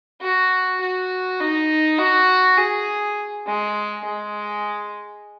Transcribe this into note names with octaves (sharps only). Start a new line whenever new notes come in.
F#4
F#4
D#4
F#4
G#4
G#3
G#3